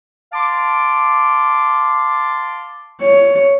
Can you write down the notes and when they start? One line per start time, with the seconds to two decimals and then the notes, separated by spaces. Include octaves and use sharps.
0.32 F5 A5 C6 D6
3.02 C#5